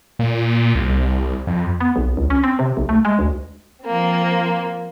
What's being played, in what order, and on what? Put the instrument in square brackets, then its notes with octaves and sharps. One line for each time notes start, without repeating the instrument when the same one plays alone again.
[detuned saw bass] A#2
C2
F2
[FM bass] B3
B1
C#2
C#4
C4
C3
B1
A3
G#3
D2
[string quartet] F3 A#3 C4